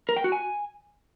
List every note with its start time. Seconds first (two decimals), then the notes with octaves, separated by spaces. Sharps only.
0.09 A#4
0.16 G5
0.24 F#4
0.32 G#5